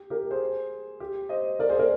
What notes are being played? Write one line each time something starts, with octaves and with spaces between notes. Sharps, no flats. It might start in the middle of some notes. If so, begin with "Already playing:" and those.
Already playing: G4
G4 A#4
G#4 C5
G4
C5 D#5
A#4 D5
G#4 C5
A#4 D5